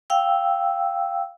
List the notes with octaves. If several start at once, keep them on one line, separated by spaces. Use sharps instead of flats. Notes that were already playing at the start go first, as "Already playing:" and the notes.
F5 G5 E6